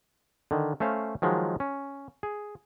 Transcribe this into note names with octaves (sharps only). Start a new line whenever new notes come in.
D3 D#3
A3 C#4 C5 F5
D#3 F3 F#3 G#3
C#4
G#4